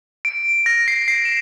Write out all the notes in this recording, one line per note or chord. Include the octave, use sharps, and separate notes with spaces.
D7
A#6
C7
C7
E7